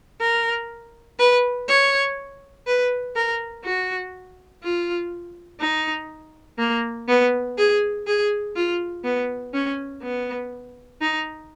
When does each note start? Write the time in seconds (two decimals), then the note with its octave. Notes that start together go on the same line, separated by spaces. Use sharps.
0.21 A#4
1.19 B4
1.68 C#5
2.67 B4
3.16 A#4
3.64 F#4
4.63 F4
5.60 D#4
6.59 A#3
7.08 B3
7.58 G#4
8.07 G#4
8.56 F4
9.04 B3
9.54 C#4
10.03 B3
11.01 D#4